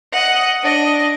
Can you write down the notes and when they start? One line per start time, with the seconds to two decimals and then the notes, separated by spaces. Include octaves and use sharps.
0.12 D#5 F#5
0.63 D4 D#5